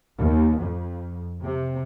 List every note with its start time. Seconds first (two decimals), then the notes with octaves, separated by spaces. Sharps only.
0.18 D#2
0.60 F2
1.44 C3